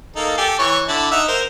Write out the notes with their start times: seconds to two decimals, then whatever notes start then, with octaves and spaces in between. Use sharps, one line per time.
0.16 A#3 D#4 A4
0.38 G4 A4 G#5
0.59 E3 C#5 C#6
0.88 D3 E4 A5
1.11 D#4 E5 F#5
1.28 A#4 C5